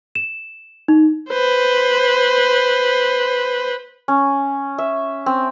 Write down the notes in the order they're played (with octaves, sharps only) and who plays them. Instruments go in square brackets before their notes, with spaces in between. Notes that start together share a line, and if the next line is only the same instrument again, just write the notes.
[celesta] E7
D#4
[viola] B4 C5
[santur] C#4
E5
C4